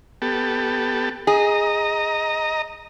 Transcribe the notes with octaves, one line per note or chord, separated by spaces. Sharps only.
B3 G4 A4
G#4 D#5 A#5